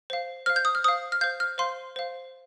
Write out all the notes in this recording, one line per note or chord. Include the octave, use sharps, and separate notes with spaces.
C5 F5
C5 F5 F6
G6
D#6
F6
C5 F5 D#6
F6
C5 F5 G6
F6
C5 F5 C6
C5 F5